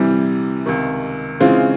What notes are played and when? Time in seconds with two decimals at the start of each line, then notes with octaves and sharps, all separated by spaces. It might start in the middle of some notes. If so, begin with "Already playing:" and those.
Already playing: C3 E3 G3
0.66 C#2 C3 D#3
1.40 C#3 E3 G#3 C4 F4